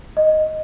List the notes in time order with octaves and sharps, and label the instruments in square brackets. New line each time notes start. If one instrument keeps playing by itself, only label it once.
[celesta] D#5